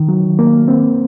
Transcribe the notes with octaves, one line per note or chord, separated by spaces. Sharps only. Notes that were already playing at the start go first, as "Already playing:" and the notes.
Already playing: D#3
F#3
A#3
C4